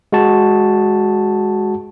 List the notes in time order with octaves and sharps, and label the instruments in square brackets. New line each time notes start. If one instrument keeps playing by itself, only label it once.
[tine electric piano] G#3 F#4 A5